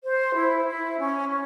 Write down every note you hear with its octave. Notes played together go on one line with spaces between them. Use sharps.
C5
E4
E4
C#4
C#4